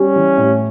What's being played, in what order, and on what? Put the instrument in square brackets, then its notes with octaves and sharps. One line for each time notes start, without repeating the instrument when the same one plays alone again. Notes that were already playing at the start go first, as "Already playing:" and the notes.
Already playing: [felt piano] G3 [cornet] C#4
[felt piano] E3
A2